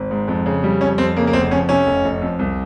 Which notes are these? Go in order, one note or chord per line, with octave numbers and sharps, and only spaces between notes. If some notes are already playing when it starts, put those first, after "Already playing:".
Already playing: G#1
G#2
F2
C#3
G3
F2 C#4
F2 C4
C#3 A#3
A#3
F1 C4
F2 C#4
C3 C#4
F1
F1
F2
C2